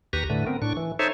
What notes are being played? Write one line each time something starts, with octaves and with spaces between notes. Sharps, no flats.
D#2 G4 B4 A#5 C#6
A2 D3 A3 B4
B3 C4 A#4
A2 D4 C#6
E3
D#4 A4 C5 C#5 E5